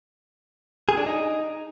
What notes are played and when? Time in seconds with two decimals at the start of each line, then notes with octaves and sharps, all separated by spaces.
0.89 G#4
0.97 D4
1.06 D#4